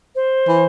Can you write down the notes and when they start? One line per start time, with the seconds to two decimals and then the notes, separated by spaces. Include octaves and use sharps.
0.15 C5
0.48 E3